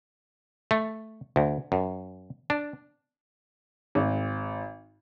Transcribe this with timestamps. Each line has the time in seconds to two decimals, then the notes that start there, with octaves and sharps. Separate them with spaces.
0.71 A3
1.36 D2
1.72 F#2
2.50 D4
3.95 G#1